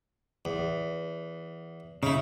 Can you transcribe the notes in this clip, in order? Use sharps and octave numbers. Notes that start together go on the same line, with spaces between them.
E2
C#3 D#4 E4